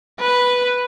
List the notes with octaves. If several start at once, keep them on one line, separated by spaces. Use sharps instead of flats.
B4